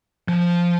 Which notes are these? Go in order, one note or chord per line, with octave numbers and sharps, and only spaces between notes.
F3